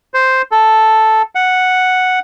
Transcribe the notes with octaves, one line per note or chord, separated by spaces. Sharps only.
C5
A4
F#5